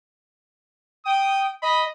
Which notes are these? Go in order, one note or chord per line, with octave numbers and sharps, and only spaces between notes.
G5 D#6
D#5 B5